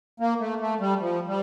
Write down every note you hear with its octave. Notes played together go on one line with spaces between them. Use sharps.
A#3
A3
A3
G3
F3
G3